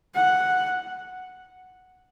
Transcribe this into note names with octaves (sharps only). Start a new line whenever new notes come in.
F#5